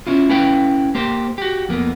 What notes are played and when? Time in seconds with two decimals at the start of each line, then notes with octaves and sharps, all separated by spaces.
0.07 C#4 E4 F4
0.29 C#4 E4 B4 F5 G5
0.95 A#3 G4 C5
1.38 F#4 G4
1.69 F2 A#3 B3